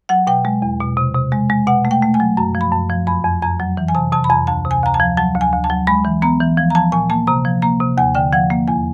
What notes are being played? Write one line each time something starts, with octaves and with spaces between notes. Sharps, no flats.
F#3 F#5
B2 G5
G#3
E2
B2
C3
C3
G#3
G#3
B2 F#5
A3
G5
A3
G#5
F#3
F#2 A#5
F3
B5
F#2
F3
F2 B5
F2
F2 A#5
F#3
E3
G#5
C3 A5
C3 A5
B5
F2 A#5
D2 A5
C3
G#5
D2 A#5
A5
F3
F#3 A5
D2
G#5
D2
A5
F#3
G#3 B5
E3
B3 A#5
E3
F3
A#5
F3 A5
A#2 G#5
A#3 A5
C3 A#5
F3
A#3 A#5
C3
D#2 G#5
D3 G5
F3 F#5
A#3
E2 G#5